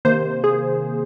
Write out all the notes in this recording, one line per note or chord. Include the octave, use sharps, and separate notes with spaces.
C3 D#3 A#3 C5
G#4